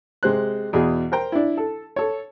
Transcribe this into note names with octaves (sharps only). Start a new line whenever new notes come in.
C3 G#3 C5 F#6
E2 B2 G#4
A#4 C5 G5 A#5
D4 E4
A4
A4 C#5